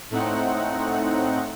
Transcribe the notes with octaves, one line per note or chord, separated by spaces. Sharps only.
A2 A3 C4 D#4 F#5